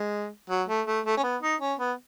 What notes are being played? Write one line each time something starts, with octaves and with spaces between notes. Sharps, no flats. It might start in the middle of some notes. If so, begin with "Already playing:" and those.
Already playing: G#3
F#3
A3
A3
A3
C#4
B3
D#4
C#4
B3